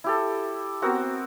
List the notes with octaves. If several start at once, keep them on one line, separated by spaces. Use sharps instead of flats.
E4 G4 A4
B3 C4 F#4 A#4